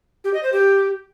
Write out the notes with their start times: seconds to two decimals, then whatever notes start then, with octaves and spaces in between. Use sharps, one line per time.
0.24 G4
0.34 D#5
0.43 C5
0.53 G4